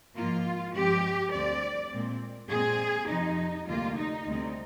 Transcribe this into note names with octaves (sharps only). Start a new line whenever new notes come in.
G#2 F3 A#3 F4
G2 F3 G#3 C4 G4
D2 D3 G3 C4 D5
A#2 G#3 C4
A#2 G#3 C4 G#4
F2 C3 F3 D#4
D2 C3 G3 A#3 F4
D#4
D2 C3 G3 C4